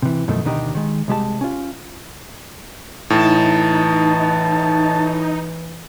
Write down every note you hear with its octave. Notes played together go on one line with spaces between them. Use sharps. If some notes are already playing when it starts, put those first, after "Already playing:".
C3 E3
F#2 B2 D#3 F3 A3
D2 B2 D#3 D4 D#4 G4
D#3 G#3
C2 G#3 G4 A5
C#4 F4
A2 E3 D#4 A5